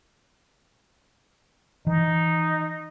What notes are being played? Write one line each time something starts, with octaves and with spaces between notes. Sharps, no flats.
E3 D#4